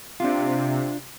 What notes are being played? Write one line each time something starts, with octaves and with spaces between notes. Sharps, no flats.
C3 D4 F4